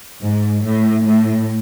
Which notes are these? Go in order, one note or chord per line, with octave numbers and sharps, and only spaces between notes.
G#2
A2
A2